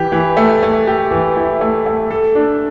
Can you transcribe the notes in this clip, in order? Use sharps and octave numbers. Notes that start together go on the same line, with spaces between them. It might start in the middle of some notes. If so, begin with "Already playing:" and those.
Already playing: E3 G4
E3
A3
A3
G4
E3
E4
A3
A3
A4
D4